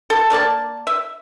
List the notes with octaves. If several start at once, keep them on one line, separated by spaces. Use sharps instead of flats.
A4
A3 A#3 D5 A5
E5